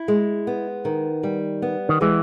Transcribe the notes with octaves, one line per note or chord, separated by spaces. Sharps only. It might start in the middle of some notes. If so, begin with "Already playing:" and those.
Already playing: E4
G#3
B3
D#3
G3
B3
D#3
E3 G#3